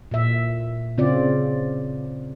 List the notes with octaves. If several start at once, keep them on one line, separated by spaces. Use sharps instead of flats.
A#2 E5
C#3 C4 F4 D5